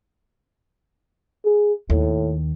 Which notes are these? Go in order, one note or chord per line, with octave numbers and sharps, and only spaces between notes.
G#4
D#2 A2